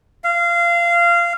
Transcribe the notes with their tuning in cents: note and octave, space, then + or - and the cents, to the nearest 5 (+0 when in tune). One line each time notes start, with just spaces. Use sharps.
F5 -20